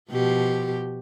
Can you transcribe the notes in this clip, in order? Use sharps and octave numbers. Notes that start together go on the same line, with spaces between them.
B2 F3 G4